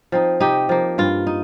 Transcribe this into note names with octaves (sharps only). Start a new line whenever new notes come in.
F3 C4 D#4
C3 D#4 G4
F3 A#3
G2 F4
D#4